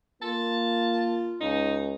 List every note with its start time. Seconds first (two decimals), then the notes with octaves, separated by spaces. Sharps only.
0.22 A#3 F4 A5
1.41 C#2 D#4